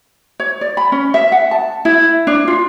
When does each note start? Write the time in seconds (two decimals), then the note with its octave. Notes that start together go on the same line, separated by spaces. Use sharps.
0.40 C#5
0.61 D5
0.77 B5
0.92 C#4
1.14 E5
1.32 F#5
1.51 A5
1.85 E4
2.27 D4
2.48 F4